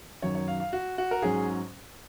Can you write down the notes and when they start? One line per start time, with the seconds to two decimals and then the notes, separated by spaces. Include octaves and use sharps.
0.22 F#2 D#3 F#3 C#5
0.35 C#5
0.48 F5
0.60 F5
0.73 F#4
0.98 F#4
1.11 A#4
1.22 G#2 F#3 C#4 G#4